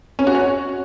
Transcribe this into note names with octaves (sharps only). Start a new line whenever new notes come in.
C#4
F#4
C#5